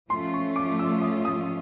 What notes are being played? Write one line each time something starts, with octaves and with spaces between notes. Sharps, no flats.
F3 A3 C#4 F4 C6
C#6
D6
E6
D#6
D#6